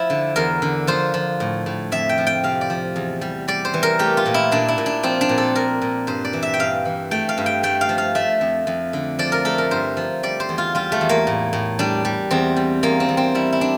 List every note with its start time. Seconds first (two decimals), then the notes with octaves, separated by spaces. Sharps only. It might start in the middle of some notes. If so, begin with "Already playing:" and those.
Already playing: F3 E4
0.10 D3
0.36 E2 A#4
0.62 D3
0.87 F3 C5
1.14 F3
1.40 A2
1.66 A2
1.92 F2 E5
2.09 G5
2.18 F3
2.27 G5
2.44 C3 F5
2.61 D5
2.70 F3
2.96 E2
3.21 G3
3.48 G3 D5
3.65 C5
3.74 E3
3.83 A#4
3.99 A3 G4
4.17 F4
4.26 A#2
4.34 E4
4.51 A#2 D4
4.68 E4
4.78 A#2
4.86 D4
5.03 F3 C4
5.21 D4
5.29 A#2
5.38 A4
5.55 A#2 A#4
5.81 A#2
6.07 G2 C5
6.25 D5
6.33 E3
6.43 E5
6.54 G5
6.59 G2 F5
6.85 E3
7.11 A3 G5
7.29 F5
7.38 G2
7.46 G5
7.63 A3 G5
7.81 F5
7.89 F3
7.98 F5
8.15 A3 E5
8.41 F2
8.67 F2
8.93 D3
9.19 F3 D5
9.32 A#4
9.45 A3 A4
9.58 A#4
9.71 G2 C5
9.97 F3
10.23 G3 D5
10.40 C5
10.49 E2
10.58 F4
10.75 G3 F4
10.92 A3
11.01 E2
11.09 A#3
11.27 A2
11.53 A2
11.79 G3 D4
12.05 G3
12.31 E2 C4
12.56 G3
12.83 E2 A#3
13.00 C4
13.09 E2
13.17 C4
13.35 G3 E4
13.52 E4
13.61 D4